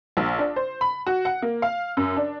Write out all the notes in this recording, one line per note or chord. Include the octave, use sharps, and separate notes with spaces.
A#1
D4
C5
B5
F#4
F#5
A#3
F5
F#2
D4